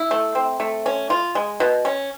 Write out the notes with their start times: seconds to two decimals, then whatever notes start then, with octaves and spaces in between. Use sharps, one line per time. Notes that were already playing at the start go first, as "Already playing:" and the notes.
Already playing: E4
0.11 A3
0.35 C4
0.60 A3
0.86 C#4
1.10 F4
1.35 G#3
1.60 B2
1.85 C#4